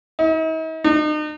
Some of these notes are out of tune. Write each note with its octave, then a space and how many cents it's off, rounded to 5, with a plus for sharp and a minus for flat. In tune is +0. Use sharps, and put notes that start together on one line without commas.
D#4 +45
D#4 -40